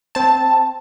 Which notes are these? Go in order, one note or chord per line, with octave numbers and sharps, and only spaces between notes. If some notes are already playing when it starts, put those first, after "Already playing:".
C4 A5